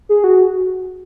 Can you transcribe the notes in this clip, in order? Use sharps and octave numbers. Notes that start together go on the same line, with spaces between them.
G#4
F#4